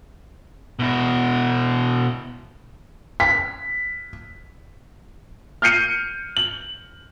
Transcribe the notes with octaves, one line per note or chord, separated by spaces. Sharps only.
B2 E4
B6
F6 G6 C7 C#7 D#7
F#7